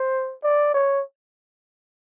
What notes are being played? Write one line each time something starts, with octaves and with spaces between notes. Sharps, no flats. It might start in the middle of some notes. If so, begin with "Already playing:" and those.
Already playing: C5
D5
C#5